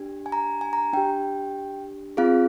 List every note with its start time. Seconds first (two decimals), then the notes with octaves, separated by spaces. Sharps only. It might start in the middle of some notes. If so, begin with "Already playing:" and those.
Already playing: D4 G4
0.26 G#5
0.32 A#5
0.61 G#5
0.73 A#5
0.93 D4 G4 G5
2.17 C4 F4 G#4 F5